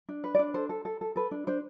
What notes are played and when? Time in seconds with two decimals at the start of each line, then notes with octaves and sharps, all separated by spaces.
0.09 D4
0.24 B4
0.35 D5
0.39 D4
0.54 A4 C5
0.69 A4
0.85 A4
1.01 A4
1.16 A4 B4
1.31 D4
1.47 D4 C5